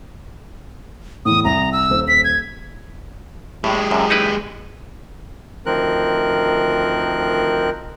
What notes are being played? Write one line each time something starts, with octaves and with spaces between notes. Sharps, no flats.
E2 A2 D#6
C2 A#5
E6
D#1 C5
B6
G#6
A2 G#3 G4
F#2 C3
D#4 E4 B4
D2 D#3 F3 C4 A#4 F#6